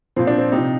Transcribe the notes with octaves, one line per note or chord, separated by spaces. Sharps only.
A#2 F3 C4
D4
C4
C3 F3 D#4